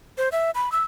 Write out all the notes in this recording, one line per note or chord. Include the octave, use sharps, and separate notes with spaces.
C5
E5
B5
E6